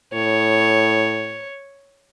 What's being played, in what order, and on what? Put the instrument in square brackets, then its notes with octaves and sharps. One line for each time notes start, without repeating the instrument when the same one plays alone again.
[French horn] A2 [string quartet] C#5